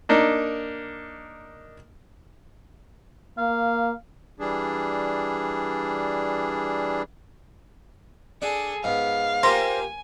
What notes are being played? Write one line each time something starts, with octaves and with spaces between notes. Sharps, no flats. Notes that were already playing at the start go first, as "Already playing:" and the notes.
A#3 D4 D#4
A#3 F5
E3 G3 D4 G#4
D4 G#4 A4
G#2 B3 F5
A#3 F4 G4 C5 G#5 A#5